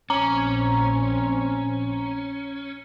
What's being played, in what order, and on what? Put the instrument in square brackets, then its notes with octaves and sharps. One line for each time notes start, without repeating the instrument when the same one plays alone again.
[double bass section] A#1 C4 [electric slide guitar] C#4 [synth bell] A#5